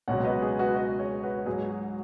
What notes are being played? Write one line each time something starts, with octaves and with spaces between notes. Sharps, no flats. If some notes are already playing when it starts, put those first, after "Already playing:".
C#2 B2 F#3 C#5 F#5
B4 D#5
G#4
F#4 B4
B4 D#5
G#4 C#5
F#4 B4
G#2 F#3 G#4
F#4